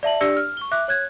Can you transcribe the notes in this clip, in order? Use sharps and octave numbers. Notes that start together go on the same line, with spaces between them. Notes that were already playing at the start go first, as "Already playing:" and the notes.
D5 E5 A5 F#7
D4 G4 D5 E6 A#6 C#7
F6
C#6 G7
E5 D6 F#6
C#5 F#6 G#6